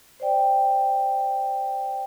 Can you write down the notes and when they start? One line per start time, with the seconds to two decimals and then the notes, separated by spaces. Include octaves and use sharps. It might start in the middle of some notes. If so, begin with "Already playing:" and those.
0.20 C5 D5 G5